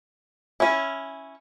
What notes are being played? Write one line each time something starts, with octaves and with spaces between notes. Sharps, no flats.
C#4 E4